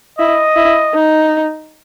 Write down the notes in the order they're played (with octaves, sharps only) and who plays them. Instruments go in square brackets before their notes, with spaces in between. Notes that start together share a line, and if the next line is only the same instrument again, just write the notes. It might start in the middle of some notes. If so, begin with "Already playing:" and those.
[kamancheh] E4 [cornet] D#5
[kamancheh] E4
D#4